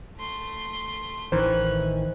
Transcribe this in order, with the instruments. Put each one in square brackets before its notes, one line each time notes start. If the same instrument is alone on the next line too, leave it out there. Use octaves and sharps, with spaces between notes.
[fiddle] A3 C6
[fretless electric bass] A1 [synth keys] D#3 E3 [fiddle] C#4 F#6 [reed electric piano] C5